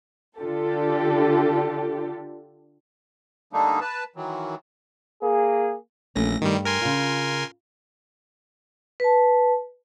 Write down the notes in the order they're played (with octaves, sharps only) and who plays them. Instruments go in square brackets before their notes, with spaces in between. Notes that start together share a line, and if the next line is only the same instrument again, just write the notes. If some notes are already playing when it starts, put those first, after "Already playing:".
[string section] D3 D4 F4 G4 A4
[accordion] D3 G3 A3 A#3 D4 D#4
B4 A5
D#3 E3 F#3
[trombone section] A#3 G#4
[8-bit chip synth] A#1 A#6 [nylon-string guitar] E3 A3 C#4
[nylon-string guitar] G2 G4 [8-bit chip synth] D#3 G3
[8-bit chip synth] A#4 G#5 C6
[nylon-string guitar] C#3 F4
[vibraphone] B4 A5